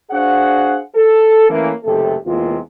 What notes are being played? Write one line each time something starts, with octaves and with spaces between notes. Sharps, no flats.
D4 F#4 G#4 C5 F5 F#5
A4
E3 A3 A#3 C#4
F#1 D#2 C3 A3 G4 A4
E2 C3 G#3 A#3 F4